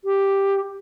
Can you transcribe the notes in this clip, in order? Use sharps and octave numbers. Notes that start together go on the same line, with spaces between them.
G4